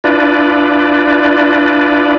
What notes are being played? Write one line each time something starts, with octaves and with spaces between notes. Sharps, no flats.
D4 E4 F4 B4 D5